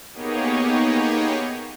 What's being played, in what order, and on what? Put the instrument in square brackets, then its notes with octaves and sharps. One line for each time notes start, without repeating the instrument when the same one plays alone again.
[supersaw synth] A#3 B3 D#4 G4 G#4 C#5